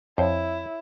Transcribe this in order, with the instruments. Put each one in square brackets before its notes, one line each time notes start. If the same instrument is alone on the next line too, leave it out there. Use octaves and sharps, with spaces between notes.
[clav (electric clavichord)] F2 C5 [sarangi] E4 [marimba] C#5